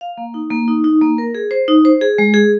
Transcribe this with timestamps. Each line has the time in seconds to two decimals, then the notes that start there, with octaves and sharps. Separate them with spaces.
0.01 F5
0.18 A#3
0.34 D#4
0.51 A#3
0.68 D#4
0.84 D#4
1.01 A#3
1.18 A#4
1.35 G#4
1.51 C5
1.68 D#4
1.85 C5
2.01 G#4
2.18 G#3
2.34 G#4